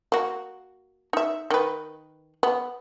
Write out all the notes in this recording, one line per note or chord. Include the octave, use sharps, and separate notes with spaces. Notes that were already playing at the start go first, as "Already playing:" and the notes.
A#3 F#4
D#4 E5
D#3 B4
B3